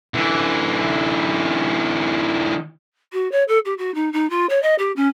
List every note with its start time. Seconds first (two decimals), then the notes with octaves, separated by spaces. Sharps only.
0.14 D3 E3
3.13 F#4
3.32 C#5
3.48 A4
3.65 G4
3.78 F#4
3.94 D#4
4.13 D#4
4.30 F4
4.49 C#5
4.62 D#5
4.78 G4
4.96 C#4